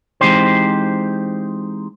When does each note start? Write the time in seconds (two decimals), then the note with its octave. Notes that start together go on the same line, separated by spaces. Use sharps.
0.21 E3 G#3 C4 D#4 G4 C5